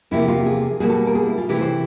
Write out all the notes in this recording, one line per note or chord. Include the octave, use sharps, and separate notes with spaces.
E2 C3 F3 A#3 E4
F4
G#4
B2 G3 A#3 G#4
A4
A#4
G#4
E4
F4
C3 E3 A3 G4
C5